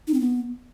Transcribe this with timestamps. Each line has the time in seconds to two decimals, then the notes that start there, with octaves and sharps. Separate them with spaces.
0.08 D#4
0.14 C4
0.20 B3